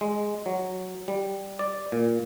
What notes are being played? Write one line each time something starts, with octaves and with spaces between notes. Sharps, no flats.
G#3
F#3
G3
D5
A#2